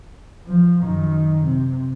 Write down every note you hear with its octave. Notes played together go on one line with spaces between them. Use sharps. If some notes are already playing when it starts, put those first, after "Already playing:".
F3
F#2 D#3
C3